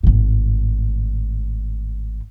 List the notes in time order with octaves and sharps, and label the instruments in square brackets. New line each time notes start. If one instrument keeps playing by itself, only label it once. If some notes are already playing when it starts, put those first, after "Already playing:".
[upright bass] G#1 A2